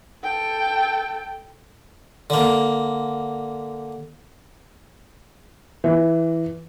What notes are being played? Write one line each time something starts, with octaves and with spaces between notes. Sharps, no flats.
A4 G5
D3 A#3
E3